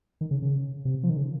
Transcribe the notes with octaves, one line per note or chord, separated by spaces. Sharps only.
D#3
C#3
C#3
C3
F3
D#3
C#3